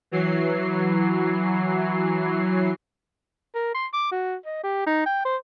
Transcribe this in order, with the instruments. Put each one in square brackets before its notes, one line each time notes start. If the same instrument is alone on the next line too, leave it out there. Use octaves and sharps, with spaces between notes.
[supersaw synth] E3 F#3 C7
[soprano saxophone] A#4
C6
D6
F#4
D#5
G4
D#4
G5
C5